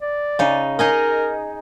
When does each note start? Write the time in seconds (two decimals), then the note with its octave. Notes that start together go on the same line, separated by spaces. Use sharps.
0.02 D5
0.39 C#3 D#4
0.79 D#4 G#4 A#4 D#5